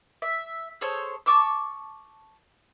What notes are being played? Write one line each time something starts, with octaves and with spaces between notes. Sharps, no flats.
E5
G#4 A4 C5 C#5
A5 C#6 D6 E6